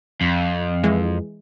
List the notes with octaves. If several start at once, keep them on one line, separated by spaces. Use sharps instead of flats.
F2
E3 G#3